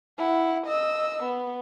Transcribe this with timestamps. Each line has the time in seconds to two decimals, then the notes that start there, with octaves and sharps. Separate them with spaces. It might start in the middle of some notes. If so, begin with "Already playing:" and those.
0.18 E4 F#5
0.66 D#5 E6
1.23 B3